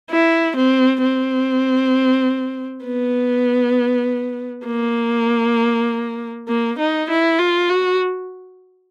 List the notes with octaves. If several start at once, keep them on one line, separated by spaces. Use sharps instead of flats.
E4
C4
C4
B3
A#3
A#3
D#4
E4
F4
F#4